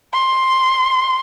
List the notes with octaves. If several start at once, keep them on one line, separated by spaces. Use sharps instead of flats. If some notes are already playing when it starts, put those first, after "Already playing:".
C6